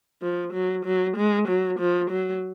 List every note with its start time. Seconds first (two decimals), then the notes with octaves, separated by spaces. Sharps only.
0.22 F3
0.53 F#3
0.85 F#3
1.17 G#3
1.48 F#3
1.79 F3
2.10 F#3